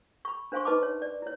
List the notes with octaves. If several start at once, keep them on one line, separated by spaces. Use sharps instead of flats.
B5 C#6
D4 C5 F5 G#5 C6 C#6
D#4 B4 D#5 A5 B5 D6
C#5
D5
E4 C#5